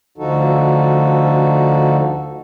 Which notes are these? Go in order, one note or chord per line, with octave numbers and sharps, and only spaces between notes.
D2 D3 F3 D#4 F#4 A4